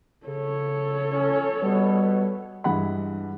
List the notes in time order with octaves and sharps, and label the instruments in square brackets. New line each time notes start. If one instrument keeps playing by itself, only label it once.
[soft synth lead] C#3 [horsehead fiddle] A4 C#5
[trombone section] C#4
[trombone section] B2 B3 [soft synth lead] G3
[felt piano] G2 E3 G#3 F#5 B5